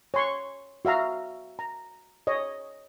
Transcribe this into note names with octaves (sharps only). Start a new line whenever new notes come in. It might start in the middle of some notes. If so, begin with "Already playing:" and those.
C#5 C6 C#6
F#4 E5 F5 A#5
A#5
C#5 D#5